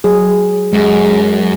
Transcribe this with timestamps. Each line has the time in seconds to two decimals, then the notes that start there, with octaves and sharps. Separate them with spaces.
0.04 F#3 G#4
0.73 F#2 G#3 G#4